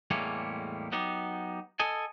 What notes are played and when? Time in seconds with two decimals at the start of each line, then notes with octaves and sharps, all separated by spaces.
0.11 E2 A2 G3 G#3 A#3 C#5
0.92 F#3 B3 D#4 G4
1.80 A4 D#5 G#5